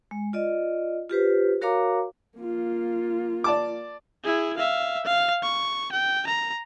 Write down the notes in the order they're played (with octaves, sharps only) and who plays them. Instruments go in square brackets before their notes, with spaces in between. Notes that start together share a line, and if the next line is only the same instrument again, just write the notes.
[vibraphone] G#3
F4 D5 D#5
F4 G4 B4 C5
F#4 A#4 C#5 F5 A#5 D6
[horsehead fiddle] A#3 F4
[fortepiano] D5 A5 D6
[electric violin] E4 G#4
E5 F5
F5
C#6
G5
A#5